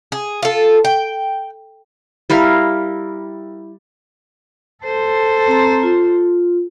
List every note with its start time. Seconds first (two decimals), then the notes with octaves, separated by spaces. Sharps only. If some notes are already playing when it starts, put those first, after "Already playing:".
0.12 G#4
0.42 F4 A4
0.85 G5
2.30 G3 E4 A#4 F5
4.84 A4 C5
5.47 C4 A#5
5.83 F4